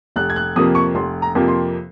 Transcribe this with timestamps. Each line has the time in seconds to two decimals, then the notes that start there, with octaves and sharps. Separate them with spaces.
0.16 F1 F#6
0.30 G#6
0.36 F#6
0.56 F2 C3 F3 A#3 D#6
0.75 C#6
0.95 F1 C6
1.22 A#5
1.35 F2 C3 F3 A#3
1.48 C6